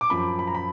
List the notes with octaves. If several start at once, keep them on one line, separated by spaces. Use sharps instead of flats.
D6
F#2 F3 B5
B5
A#5
B5